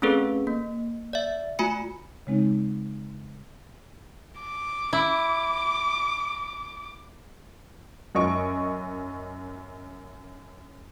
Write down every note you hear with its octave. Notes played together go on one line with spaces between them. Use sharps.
A3 C4 C#4 G#4 A4 B4
A#3
D5 E5
A3 F4 F#4 G#5 B5 C#7
C#3 G#3 C4 D#4
D6
E4
F#2 D#5 C#6 D7